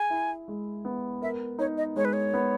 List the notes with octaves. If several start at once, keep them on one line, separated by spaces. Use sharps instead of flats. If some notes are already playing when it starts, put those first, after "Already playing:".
Already playing: G#4 G#5
E4
G#3
B3
A#4 E5
D#4 C#5
D#5
G#3 C#5
B4
C#5
B3